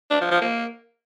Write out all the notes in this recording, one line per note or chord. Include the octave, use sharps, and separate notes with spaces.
D4
F3
F3
A#3